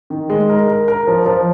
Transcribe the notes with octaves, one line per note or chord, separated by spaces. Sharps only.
D#3
G#3
A#4
A#4
A#4
F3
F3